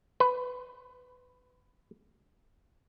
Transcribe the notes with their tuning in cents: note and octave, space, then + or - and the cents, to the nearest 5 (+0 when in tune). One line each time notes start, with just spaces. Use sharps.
B4 +15